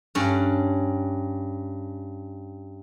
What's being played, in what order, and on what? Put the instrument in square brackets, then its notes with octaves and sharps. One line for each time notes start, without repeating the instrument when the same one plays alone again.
[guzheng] G2 C#4